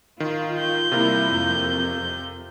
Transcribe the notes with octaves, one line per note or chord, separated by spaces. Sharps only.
D#3 F4
G6
C3 G3 A#3 E4 F4 A#4
F2